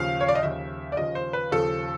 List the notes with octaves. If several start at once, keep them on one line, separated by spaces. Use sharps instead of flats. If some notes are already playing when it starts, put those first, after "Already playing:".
Already playing: D#2 C#3 F3 F5
C#5
D5
D#5
D#2 C#3 F3 E5
D5
D#2 C#3 F3 D#5
C5
B4
D#2 C#3 F3 A4